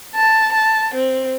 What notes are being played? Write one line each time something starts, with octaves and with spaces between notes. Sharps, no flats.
A5
A5
C4